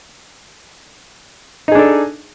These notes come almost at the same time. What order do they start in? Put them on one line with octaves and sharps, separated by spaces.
D#4 G#4 D4 A4